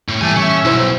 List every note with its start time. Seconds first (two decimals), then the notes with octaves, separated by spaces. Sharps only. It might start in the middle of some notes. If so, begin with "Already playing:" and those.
0.08 A2
0.21 A#2 E3 G3 A3 G4 G#5
0.36 C#4 E5
0.65 B1 E4 C5